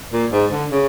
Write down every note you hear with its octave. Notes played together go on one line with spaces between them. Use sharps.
A#2
G#2
D3
C#3